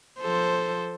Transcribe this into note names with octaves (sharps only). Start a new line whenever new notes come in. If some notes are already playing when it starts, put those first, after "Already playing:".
F3 A4 C5